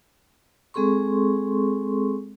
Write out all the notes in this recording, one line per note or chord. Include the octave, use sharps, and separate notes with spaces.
G#3 C4 G#4 A4 C6 C#6